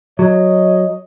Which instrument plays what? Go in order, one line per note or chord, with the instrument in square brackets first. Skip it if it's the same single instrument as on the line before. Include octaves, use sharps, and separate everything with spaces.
[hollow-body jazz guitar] F#3 [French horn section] C#5 D#5